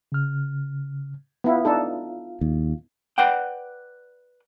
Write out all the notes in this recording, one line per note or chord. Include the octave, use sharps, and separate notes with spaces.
C#3 F6
B3 E4 F4 F5
D4 D#4 A4
D#2
B4 D5 F#5 G5